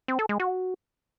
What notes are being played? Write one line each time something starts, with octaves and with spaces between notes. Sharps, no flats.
C4
A4
G#3
F#4